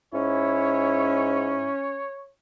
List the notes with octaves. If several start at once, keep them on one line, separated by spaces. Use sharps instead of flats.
G#2 C#4 E4 C#5